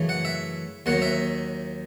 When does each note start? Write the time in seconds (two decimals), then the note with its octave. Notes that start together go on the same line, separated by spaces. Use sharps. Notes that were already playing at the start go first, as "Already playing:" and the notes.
Already playing: F#2 C#3 E3 A3
0.09 F#5
0.25 E5
0.86 D#2 D#3 F#3 F#5
1.02 E5